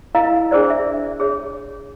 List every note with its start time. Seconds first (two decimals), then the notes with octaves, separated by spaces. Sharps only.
0.15 E4 A#4 D#5 F5 A#5
0.51 D4 G#4 A#4 C5 D5
0.70 E5
1.20 G#4 C#5